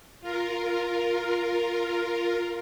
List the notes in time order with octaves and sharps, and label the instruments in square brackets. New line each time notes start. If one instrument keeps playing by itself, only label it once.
[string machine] F4 A#4